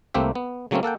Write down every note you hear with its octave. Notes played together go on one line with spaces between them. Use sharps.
C2 A3 A#3 C4 G4 E5
B3
C#3 F#3 A3 A#3 C4 C#4
A#3 A4 F#5 G5